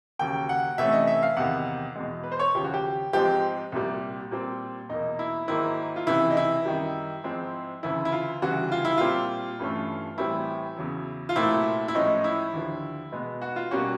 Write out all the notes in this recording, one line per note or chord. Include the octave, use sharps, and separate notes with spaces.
D#2 C#3 F#3 A#3 G5
F#5
C3 E3 A3 C#4 E5
D#5
E5
F5
E2 C3 D#3 F#5
E2 B2 G#3
B4
C5
C#5
D#2 C#3 F3 G4
F#4
G4
G#2 F3 G#3 C4 G4
C2 A#2 G3
A#2 G3 C4
E2 B2 F#3 A#3 D#4
E4
G#2 D#3 F#3 A#3 E4
F4
C#2 C3 E3 E4
D#4
E4
F#2 D#3 G3
G#2 F3 G#3 C4
D2 C#3 E3 E4
E4
F4
D2 C#3 E3 G3 F#4
F4
E4
A#2 G3 C4 F4
G2 E3 A3 C#4
A2 E3 G3 C4 E4
E2 C#3 F#3
F4
C2 A#2 F#3 A3 C4 E4
E4
A2 F3 G#3 C#4 D#4
E4
D#2 D3 F3
B2 G#3 B3
F#4
F4
B2 G3 A#3 C#4 F#4